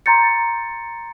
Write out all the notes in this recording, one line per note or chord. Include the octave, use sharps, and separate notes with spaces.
A#5 C6 G6 A6 C#7